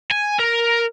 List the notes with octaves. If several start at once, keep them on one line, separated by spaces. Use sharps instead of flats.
G#5
A#4